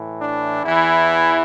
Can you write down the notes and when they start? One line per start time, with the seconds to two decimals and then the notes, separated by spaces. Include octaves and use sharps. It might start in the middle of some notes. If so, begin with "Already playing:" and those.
Already playing: A2 E3
0.20 D4
0.64 E2 E3 E4